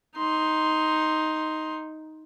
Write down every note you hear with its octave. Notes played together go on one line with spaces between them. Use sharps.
D#4 C6